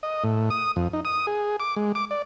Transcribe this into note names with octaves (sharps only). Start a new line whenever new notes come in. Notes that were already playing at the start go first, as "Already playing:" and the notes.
D#5
A2
D#6
F2
D#4
D#6
G#4
D6
G#3
D6
D5